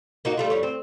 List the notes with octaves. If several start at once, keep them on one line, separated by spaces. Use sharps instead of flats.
A#3 D#4 F#4
G3 A3 F4
F2 G3 C#5
C4